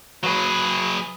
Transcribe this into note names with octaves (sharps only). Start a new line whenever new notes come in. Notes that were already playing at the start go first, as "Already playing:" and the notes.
F#3 G#4 B4